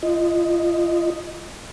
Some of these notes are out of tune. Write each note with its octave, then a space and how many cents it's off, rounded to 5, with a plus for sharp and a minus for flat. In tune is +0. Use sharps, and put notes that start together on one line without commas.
F4 -30 D#5 +0